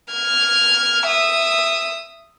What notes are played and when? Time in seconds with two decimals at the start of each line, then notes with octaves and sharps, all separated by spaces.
0.13 F6 G#6
1.07 E5 D#6